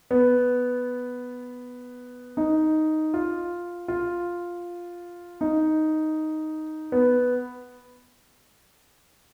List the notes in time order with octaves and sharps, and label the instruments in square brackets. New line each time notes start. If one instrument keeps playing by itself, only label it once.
[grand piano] B3
D#4
F4
F4
D#4
B3